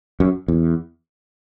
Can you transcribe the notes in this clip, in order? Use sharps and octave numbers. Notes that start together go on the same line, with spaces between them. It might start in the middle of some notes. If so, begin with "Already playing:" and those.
F#2
E2